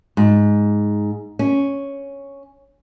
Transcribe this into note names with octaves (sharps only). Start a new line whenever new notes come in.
G#2
C#4